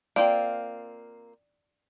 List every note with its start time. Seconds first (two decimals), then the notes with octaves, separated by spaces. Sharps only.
0.16 A#3 C4 F4 D5 G5